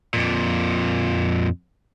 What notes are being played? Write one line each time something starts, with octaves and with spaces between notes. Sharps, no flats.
F2 A#2